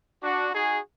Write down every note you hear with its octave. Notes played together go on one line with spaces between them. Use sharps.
D4 F#4
D#4 F#4 G#4